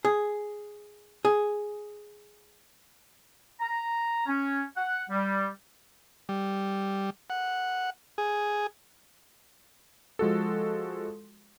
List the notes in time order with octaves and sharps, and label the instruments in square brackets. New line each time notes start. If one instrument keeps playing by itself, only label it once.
[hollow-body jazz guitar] G#4
G#4
[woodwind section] A#5
C#4
F#5
G3
[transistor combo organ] G3
F#5
G#4
[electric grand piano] F3 G#3 F#4 A4